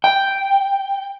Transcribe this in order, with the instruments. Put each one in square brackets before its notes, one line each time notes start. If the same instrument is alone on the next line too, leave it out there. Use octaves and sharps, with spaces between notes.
[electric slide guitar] G5